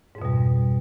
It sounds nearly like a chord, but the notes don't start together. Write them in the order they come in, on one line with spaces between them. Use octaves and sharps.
G#2 F2 B2 G3